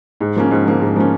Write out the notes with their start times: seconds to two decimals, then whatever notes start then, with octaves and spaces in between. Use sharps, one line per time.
0.20 G#2
0.36 F3 A#3 C#4
0.51 G#2
0.66 F3 A#3 C#4
0.81 G#2
0.96 F3 A#3 C#4